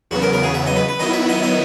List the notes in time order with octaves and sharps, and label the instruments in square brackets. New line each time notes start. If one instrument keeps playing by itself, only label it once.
[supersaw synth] E2 C#3 F#3 B3 [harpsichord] F#4
[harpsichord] A#4
A#4
G#4
E5
D#5
B4
B4
[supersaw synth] D#3 F#3 B3 E4 [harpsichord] D#5
[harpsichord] E5
D#5
D#5